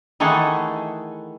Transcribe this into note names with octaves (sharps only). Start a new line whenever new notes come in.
D#3 E3 A3 G#4 A4 F#5